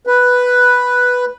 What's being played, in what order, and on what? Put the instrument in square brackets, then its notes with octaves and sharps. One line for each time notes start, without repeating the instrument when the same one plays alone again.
[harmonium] B4